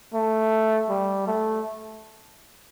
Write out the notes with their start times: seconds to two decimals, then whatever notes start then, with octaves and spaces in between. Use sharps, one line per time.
0.14 A3
0.90 G3
1.28 A3